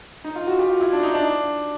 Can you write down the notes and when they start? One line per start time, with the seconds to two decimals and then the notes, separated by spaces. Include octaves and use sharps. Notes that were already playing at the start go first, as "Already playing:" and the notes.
0.24 D#4
0.36 F4
0.47 F#4
0.59 G4
0.70 F4
0.81 E4
0.92 D4
1.03 D#4
1.14 D4